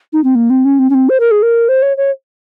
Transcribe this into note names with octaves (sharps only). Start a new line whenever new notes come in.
D#4
C4
A#3
C4
C#4
C4
C#4
C4
C5
A#4
G#4
A#4
C5
C#5
C#5